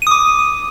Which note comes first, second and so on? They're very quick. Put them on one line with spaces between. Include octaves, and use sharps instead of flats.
D#7 D#6 D6